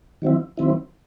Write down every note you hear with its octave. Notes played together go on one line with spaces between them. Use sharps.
D#3 F#3 C4 E4
D#3 F#3 C4 E4